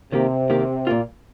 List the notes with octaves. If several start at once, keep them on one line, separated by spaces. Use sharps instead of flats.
C3 D#3 A#3 G4
D#3 A#3 G4
A#2 A#3 F4